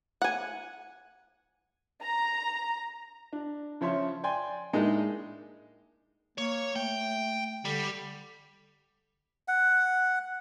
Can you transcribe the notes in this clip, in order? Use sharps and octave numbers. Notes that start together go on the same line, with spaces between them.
F#5 G#5
A#5
D4
C#3 F3 C#5 E5 C6
D5 G5 G#5 C6
A2 G#3 A#3 D4 D#4
A#3 C#5
A3 G5
D3 G3
F#5